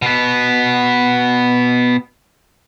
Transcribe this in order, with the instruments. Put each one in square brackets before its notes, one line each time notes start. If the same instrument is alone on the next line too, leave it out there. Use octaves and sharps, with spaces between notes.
[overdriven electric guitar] B2 B3